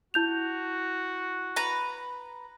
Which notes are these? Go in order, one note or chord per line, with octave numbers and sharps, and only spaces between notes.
E4 F#4 G6 F7
B4 A#5